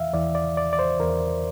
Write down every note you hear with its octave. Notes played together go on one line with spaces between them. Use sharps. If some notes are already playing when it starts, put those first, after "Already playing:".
Already playing: E2 E3 E5 F5
E2 E3 D5
D5
D5
D5
C5
E2 E3 A#4